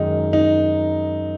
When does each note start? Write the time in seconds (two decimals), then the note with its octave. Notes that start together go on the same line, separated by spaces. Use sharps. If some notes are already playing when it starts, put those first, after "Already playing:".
Already playing: F#2 D#3 G#3 D#4
0.33 D#4